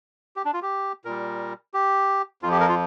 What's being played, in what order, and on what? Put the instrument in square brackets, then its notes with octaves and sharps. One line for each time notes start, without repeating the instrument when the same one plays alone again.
[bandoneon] G4
D4
F4
G4
A#2 G3 A#4
G4
F2 F4
F3 G4
A#4
F4